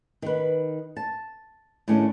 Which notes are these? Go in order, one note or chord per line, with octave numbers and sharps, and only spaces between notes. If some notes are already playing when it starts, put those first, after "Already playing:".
D#3 B4
A5
A2 D#3 A3 C#4 D4 G#4